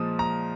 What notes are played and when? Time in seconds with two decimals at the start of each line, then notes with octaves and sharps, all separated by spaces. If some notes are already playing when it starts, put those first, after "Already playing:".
Already playing: A#2 F3 G#3 D#6
0.19 A#5